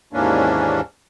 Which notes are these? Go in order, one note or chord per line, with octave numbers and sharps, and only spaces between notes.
D#2 G#2 E3 A#3 C#4 D4